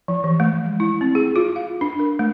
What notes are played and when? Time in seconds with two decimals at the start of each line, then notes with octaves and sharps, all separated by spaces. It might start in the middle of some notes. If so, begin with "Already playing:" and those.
0.08 F3
0.24 E3
0.40 A3
0.65 G#3
0.80 E4
1.01 C4
1.15 G#4
1.36 F4
1.56 F5
1.81 D4
1.99 A#4
2.19 A3